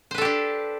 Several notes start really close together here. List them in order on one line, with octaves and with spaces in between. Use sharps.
C5 B4 A4 G4 D4